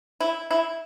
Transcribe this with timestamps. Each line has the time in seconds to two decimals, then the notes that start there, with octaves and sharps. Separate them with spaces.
0.20 E4
0.51 E4